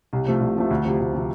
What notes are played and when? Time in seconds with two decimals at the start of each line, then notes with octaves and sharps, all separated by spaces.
0.13 C2
0.26 C3 F3 A3
0.41 C2
0.56 C3 F3 A3
0.70 D2
0.85 C3 F3
0.99 D2
1.14 C3 F3